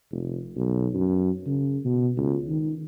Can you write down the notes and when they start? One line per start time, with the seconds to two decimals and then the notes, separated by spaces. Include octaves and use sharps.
0.11 F1
0.56 B1
0.94 F#2
1.46 C#3
1.85 B2
2.17 C#2
2.47 D#3